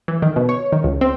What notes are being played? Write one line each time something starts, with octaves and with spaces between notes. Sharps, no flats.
E3
D#3
B2
C#5
D#3
C#2
C4